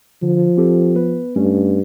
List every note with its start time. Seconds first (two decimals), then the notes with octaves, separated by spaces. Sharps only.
0.23 D3 F3
0.57 C4 G4 A4
0.96 B3 B4
1.36 G2 A3 C#4